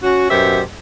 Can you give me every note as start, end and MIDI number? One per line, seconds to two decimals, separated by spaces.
0.03 0.30 61
0.03 0.30 66
0.31 0.61 42
0.31 0.61 47
0.31 0.61 67
0.31 0.61 72
0.31 0.61 76